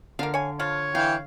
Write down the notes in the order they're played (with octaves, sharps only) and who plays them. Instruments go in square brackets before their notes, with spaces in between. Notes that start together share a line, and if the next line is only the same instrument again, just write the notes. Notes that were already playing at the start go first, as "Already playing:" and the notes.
[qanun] D3 F5 [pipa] F3 A#3
[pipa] C#5 G#5
[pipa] F3 F4 [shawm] C#5
[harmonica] E3 G5 [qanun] F5